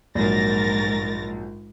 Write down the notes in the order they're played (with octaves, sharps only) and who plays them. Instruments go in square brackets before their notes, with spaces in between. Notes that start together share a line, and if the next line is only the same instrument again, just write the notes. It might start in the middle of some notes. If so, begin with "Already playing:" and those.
[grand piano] A#1 F#3 [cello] G#2 [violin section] A#4 A6 A#6